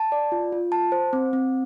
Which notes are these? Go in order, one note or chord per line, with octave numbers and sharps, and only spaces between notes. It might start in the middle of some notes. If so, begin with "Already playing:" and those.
Already playing: A5
D5
F4
F4
A5
C5
C4
C4